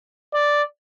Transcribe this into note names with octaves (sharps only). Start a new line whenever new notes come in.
D5